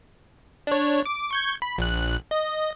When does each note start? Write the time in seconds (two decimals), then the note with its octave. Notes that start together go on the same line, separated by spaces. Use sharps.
0.67 D4 C#5
1.05 D6
1.31 C#6 G6 G#6
1.62 B5
1.78 A#1 F#6
2.31 D#5